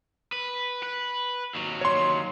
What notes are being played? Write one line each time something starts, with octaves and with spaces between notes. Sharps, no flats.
B4
B4
D#2 F#3
C#5 C6